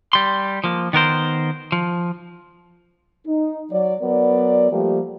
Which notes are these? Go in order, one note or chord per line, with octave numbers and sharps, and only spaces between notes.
G3 C6
F3 A#3
D#3 B3 A#4 C5
F3
D#4
F#3 D5
F#3 B3 A#4 D5
F3 G3 A3 A#3 G4